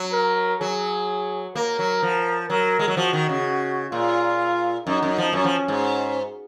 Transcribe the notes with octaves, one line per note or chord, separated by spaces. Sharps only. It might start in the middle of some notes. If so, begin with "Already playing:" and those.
Already playing: F#3
A#4
F#3 G#4
A#3 A#4
F#3
F3
F#3 A#4
G#3
F#3
F3 F#4
D#3
C#3
A#2 F4
F#2 D#4
F#2
F3
F#2 C#4
F3
G#2